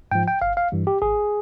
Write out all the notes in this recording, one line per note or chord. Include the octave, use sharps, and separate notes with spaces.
G#2 F3 G5
G5
G1 F5
F5
G2 E3 G3
G4
G#1 G#4